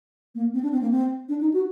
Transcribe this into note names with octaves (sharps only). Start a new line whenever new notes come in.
A#3
C4
D4
C4
A#3
C4
D4
D#4
F#4